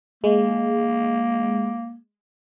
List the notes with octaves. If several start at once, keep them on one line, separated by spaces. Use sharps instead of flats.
G#3 A#3